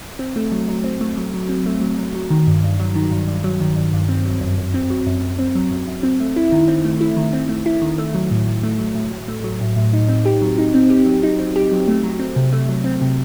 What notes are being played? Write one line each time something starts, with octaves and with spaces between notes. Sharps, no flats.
C4
A3
F#3
F#3
C4
A3
F#3
F#3
C4
A3
F#3
F#3
F#3
D#3
G2
G2
F#3
D#3
G2
G2
F#3
D#3
G2
G2
C4
F#3
F#2
F#2
C4
F#3
F#2
F#2
C4
F#3
F#2
F#2
C4
A3
E4
D#3
C4
A3
E4
D#3
C4
A3
E4
D#3
A3
F#3
A2
A2
A3
F#3
A2
A2
A3
F#3
A2
A2
D#4
C4
G4
F#3
D#4
C4
G4
F#3
D#4
C4
G4
F#3
A3
F#3
C4
C3
A3
F#3
C4
C3